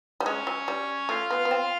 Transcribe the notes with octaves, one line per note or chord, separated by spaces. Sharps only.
G3
G#3 C#4 C#5
F#3
G3
A3 F4 F5
B3
B3
C4